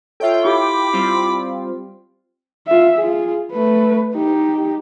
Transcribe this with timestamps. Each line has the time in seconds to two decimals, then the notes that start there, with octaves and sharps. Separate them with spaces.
0.20 F4 A4 C#5 E5 G5
0.45 E4 G4 B5 D6
0.93 G3 C4 F4
2.67 F4 E5
2.98 F4 G#4
3.52 A3 B4
4.14 D#4 G4